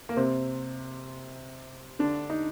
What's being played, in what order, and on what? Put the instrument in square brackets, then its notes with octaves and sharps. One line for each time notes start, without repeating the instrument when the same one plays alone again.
[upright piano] A#3
C3 C4
D3 D4
D#4